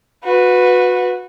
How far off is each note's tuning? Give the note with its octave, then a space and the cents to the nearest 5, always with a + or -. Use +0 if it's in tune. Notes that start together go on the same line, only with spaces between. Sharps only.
F#4 -25 B4 +0